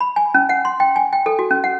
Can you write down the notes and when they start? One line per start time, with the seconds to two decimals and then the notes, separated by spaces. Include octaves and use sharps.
0.01 B5
0.16 G#5
0.34 C#4
0.49 F#5
0.65 C6
0.80 G5
0.96 G#5
1.13 G5
1.26 A4
1.39 F#4
1.51 C#4
1.64 F#5